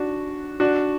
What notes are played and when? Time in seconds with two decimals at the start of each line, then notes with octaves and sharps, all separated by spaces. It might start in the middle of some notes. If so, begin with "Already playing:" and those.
Already playing: D4 F#4
0.60 D4 F#4